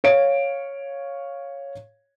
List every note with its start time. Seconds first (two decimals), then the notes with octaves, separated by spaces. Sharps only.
0.04 C#5 F5 D7